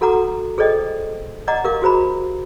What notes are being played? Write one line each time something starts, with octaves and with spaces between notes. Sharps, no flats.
F#4 A4 F#5 A#5 D6
G#4 A4 C5 D5 D#5 G5
D5 D#5 F#5 A#5 D6
G4 A#4 F5 D6
F#4 G#4 C5 A#5 B5